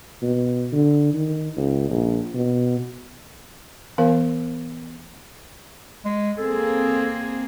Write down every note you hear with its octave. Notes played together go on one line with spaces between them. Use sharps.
B2
D3
D#3
C#2
A#1
B2
E3 B3 A#4 F5
G#3
A#3 C4 G#4 A4